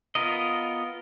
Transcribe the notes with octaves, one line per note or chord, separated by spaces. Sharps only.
B3 F4 A#4 D#5